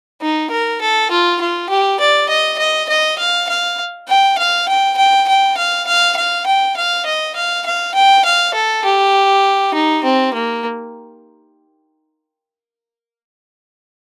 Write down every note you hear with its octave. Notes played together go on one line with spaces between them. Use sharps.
D#4
A#4
A4
F4
F4
G4
D5
D#5
D#5
D#5
F5
F5
G5
F5
G5
G5
G5
F5
F5
F5
G5
F5
D#5
F5
F5
G5
F5
A4
G4
D#4
C4
A#3